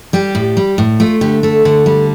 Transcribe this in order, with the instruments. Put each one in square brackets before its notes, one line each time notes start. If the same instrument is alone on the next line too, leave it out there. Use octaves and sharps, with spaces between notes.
[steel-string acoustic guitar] G3 G4
A2
G3
A2
A3 F4
D3 G4
A3 A4
D3
G3